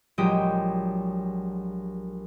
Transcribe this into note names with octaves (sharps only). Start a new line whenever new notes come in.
A#1 F#3 G#3 G4 G5 D#6